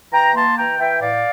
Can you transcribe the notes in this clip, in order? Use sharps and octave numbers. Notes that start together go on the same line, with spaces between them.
E3 G5 A#5
A#3 A5 C6
E3 G5 A#5
E3 E5 G5
A2 D5 F5